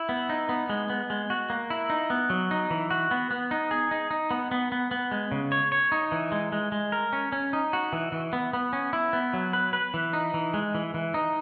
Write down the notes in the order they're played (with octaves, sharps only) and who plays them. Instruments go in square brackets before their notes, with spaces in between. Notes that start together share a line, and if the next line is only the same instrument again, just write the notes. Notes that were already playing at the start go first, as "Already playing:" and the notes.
Already playing: [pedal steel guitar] E4
B3
D#4
B3
G#3
B3
G#3
F#4
A#3
E4
D#4
B3
F#3
D#4
E3
F#4
B3
B3
D#4
G#4
D#4
D#4
B3
B3
B3
B3
G#3
C#3
C#5
C#5
D#4
E3
G#3
G#3
G#3
A#4
C#4
C#4
D#4
F#4
E3
E3
B3
B3
C#4
E4
B3
F#3
B4
B4
E3
D#4
E3
G#3
E3
E3
D#4